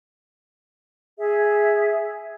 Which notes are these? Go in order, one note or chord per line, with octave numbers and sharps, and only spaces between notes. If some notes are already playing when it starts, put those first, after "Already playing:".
G#4 E5